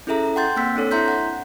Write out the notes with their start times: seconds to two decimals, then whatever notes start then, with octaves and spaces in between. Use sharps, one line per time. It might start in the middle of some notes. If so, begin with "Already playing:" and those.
0.07 C#4 E4 G#4 A4 E5 A#5
0.36 F#5 G5 C6 G6 A6
0.56 A#3 C4 E6 B6
0.76 C4 D4 A4 C#5
0.91 E4 E5 A#5 C6 G6 B6
1.08 F#5